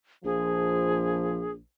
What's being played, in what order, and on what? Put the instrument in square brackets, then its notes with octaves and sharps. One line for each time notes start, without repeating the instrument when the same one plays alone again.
[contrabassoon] A#1 [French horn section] F3 [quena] G#4